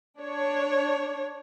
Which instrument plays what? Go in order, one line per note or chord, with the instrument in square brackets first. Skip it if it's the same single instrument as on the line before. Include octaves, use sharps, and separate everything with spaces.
[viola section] D4 C#5